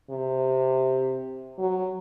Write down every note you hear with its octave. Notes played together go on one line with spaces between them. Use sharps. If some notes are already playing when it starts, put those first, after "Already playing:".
C3
F#3